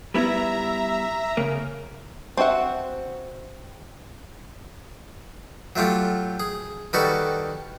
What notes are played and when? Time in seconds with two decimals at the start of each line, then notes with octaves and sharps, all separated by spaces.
0.14 G3 B3 E4 E5 A#5
1.37 C#3 A#3
2.37 C4 F#4 G#4 E5 F#5
5.76 F#3 A3 F4 G4
6.40 G#4
6.93 D#3 G3 F#4 A4 B4 C#6